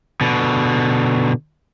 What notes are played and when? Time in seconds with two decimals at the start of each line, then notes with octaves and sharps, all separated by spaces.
0.21 B2 D3